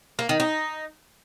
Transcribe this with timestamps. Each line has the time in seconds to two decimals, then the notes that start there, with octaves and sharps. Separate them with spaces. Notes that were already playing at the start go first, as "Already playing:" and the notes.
0.19 A#3
0.29 D#3
0.40 D#4